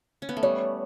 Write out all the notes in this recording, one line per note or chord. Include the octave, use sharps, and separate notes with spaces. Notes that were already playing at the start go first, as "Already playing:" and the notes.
C#4
B3
A3
G3 C#5